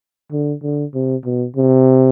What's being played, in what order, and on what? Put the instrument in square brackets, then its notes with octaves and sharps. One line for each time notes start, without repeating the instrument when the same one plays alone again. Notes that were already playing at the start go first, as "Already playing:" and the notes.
[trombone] D3
D3
C3
B2
C3